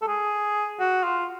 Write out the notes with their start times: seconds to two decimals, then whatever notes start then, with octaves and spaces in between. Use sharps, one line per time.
0.02 A4
0.08 G#4
0.80 F#4
1.04 F4